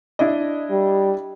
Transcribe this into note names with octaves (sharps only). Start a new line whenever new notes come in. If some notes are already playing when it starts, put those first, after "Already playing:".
D4 E4 D#5
G3